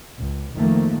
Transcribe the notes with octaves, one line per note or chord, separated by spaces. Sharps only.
C#2
F2 D#3 F3 A3 A#3